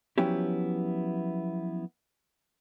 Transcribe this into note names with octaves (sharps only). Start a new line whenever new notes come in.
F3 F#3 B3 C#4 E4 G4